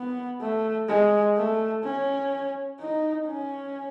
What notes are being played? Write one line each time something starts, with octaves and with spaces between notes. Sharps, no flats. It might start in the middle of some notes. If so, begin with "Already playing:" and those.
Already playing: B3
A3
G#3
A3
C#4
D#4
C#4